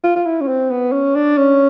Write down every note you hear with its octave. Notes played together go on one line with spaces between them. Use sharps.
F4
F4
E4
C#4
C4
B3
C#4
D4
C#4